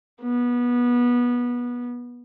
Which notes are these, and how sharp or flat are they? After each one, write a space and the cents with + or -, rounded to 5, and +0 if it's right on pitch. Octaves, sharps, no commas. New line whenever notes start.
B3 -20